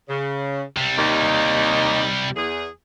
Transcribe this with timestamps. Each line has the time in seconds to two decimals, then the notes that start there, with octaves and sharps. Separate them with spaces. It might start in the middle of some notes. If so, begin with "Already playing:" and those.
0.08 C#3
0.77 C3 G3
0.98 D#2 A#3 D#4
2.36 E2 G#4